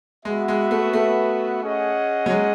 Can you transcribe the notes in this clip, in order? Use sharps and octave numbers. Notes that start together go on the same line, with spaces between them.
G#3 B3 F#4 B4 E5
G#3
A3
A3
C#4 G#4 D#5 F#5
F#3
G#3